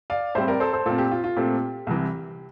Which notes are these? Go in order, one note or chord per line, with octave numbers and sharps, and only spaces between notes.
D5 F5
A2 G3 C4 C5 E5
A#4 D5
A4 C5
A4 C5
A#2 A3 C4 F4 A4
G4
F4
F4
A#2 A3 C4 G4
C2 C3 E3